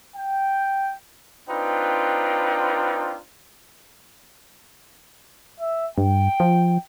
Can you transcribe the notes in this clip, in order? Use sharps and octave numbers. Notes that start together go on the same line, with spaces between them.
G5
C4 D4 D#4 F4 B4 G5
E5
G2 G5
F3